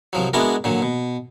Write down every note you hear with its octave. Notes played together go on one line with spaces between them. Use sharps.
C2 F3 F#3
G#3 B3 D4 E4 F#4 A#4
A#2 D3 F#3
B2